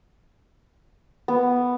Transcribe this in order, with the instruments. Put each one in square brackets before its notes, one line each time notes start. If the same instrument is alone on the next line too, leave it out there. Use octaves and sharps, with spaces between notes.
[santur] B3